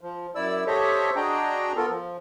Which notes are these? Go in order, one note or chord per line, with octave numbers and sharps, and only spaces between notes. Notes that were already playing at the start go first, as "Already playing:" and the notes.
F3
F#2 E4 D5 E6
G4 A4 C5 C#5 D#5 E5
D4 F#4 G#4 D#5 G5 A#5
B3 F4 A4 A#4
F3